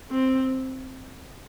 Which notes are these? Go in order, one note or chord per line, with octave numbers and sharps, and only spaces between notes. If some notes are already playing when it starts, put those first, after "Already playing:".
C4